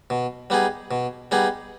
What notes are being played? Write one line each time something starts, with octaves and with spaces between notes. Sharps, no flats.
B2
G3 B3 D#4 G#4
B2
G3 B3 D#4 G#4